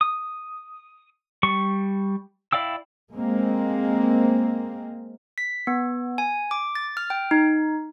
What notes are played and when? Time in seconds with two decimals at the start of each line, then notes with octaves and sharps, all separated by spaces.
0.01 D#6
1.43 G3 C#6
2.53 E4 D5 F5 G5 E6
3.13 G#3 A#3 C4
5.38 B6
5.67 B3
6.18 G#5
6.51 D6
6.75 A6
6.97 F6
7.10 G5
7.31 D#4